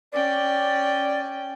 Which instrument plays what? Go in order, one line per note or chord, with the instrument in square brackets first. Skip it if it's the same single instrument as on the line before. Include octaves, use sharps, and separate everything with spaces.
[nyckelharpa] C#4 G5 [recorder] D5